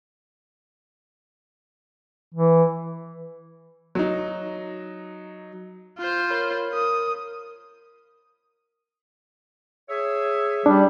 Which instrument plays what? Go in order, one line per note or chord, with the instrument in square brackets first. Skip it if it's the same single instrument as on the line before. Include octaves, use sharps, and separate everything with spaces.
[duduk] E3
[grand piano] F#3 D#4
[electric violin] F4 C5
[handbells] A#4 C#5 B5
[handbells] A#4 [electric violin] D#6
[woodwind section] G#4 C#5 E5
[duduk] G3 [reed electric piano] D4